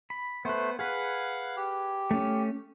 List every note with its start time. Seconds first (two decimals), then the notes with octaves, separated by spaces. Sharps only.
0.10 B5
0.45 A3 B3 B4 C5
0.79 G#4 B4 F5 F#5
1.57 G4
2.11 A3 C#4